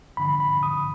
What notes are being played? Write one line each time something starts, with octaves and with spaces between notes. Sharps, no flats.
G2 D3 F3 B5
B5
D#6